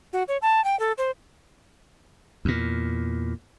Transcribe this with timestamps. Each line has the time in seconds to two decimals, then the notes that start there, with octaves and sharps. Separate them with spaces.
0.13 F#4
0.28 C#5
0.42 A5
0.64 G5
0.79 A4
0.98 C5
2.45 E2 A#2